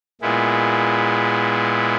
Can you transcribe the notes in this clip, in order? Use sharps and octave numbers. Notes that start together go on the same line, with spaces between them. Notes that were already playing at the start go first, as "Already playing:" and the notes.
A#2 G#3 B3 E4